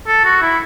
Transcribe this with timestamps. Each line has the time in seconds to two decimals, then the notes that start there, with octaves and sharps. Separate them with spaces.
0.07 A4
0.25 F#4
0.42 E4